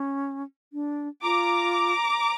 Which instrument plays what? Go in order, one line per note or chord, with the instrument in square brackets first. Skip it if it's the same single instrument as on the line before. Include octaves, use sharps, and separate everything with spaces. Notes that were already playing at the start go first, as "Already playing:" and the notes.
Already playing: [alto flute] C#4
D4
[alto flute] F4 [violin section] A#5 D6